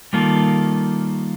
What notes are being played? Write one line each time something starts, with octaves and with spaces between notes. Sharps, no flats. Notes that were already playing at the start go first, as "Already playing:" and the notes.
D#3 G3 A#3 F4 A4